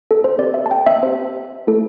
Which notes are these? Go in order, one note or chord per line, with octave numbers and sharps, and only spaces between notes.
A4
C5
C4 G4 D5
E5
A5
G5
E5
C4 G4 C5
A3 E4 A4